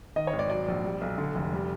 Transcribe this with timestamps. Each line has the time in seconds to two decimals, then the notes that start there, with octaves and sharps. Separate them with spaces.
0.16 D#3 D#5
0.27 C#5
0.33 G#1
0.39 D5
0.50 F#3 D5
0.68 A#1
0.84 G3
1.01 B1
1.18 D3
1.35 F1
1.53 G3